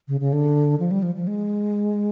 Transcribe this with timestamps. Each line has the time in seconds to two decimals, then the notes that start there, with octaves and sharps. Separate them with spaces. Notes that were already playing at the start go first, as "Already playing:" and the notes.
0.08 C#3
0.20 C#3
0.33 D3
0.80 F3
0.91 G3
1.03 F3
1.15 F3
1.27 G#3